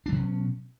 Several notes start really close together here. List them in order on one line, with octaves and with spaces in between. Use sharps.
D4 F#3 B2 C#4